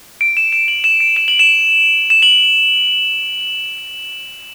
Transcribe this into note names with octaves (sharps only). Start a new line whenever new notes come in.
D7
E7
E7
F#7
E7
D7
E7
F#7
E7
E7
F#7